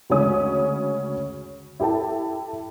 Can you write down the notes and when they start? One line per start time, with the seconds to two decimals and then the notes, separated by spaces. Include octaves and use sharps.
0.10 D2 C#3 G#3 C#4 D#6
1.80 E4 G4 A4 G5 A5